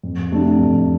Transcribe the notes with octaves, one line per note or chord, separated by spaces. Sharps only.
F2
C3 A3 D4
F2